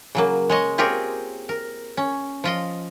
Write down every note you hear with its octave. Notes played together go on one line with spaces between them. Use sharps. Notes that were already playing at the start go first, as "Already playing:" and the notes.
C#3 F#3 A#3
G#3 C#5 D#5
C4 F4 G4 G#4 A#4 C#5
A#4
C#4
F3 F4 D#5